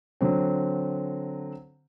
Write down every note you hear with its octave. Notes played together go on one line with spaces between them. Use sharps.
D3 F#3 C4